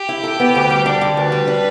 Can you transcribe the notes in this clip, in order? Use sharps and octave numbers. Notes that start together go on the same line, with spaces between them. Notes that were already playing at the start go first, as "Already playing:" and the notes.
Already playing: G4
E4
A4
B3
D2
G3
D4
D3
D2 B4
G3
D4